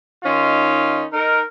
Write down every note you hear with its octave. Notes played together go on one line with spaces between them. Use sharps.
D#3 C#4 D#4 F4
D#4 A#4